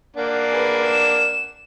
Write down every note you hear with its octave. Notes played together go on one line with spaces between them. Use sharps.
A#3 D4 F#5
G#4 B4
E7